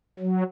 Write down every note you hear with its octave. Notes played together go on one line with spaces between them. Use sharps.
F#3